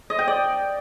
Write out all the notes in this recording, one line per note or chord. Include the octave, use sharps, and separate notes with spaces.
D#5
G5
D5